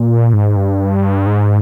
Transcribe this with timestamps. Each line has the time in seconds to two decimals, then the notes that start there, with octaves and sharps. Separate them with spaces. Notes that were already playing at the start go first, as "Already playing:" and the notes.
Already playing: A#2
0.33 G#2
0.56 G2
1.27 G#2